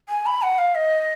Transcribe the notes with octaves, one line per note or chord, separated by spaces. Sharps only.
G#5
B5
F#5
F5
D#5